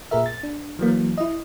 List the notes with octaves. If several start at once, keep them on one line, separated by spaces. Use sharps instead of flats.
A#2 G#4 A#4 E5
A6
D4
E3 F#3 A#3
E4 D#5